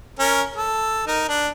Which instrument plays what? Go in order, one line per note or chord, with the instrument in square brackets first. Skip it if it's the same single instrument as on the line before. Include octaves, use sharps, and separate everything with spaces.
[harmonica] C#4 A#4
A4
D#4 A#4
D4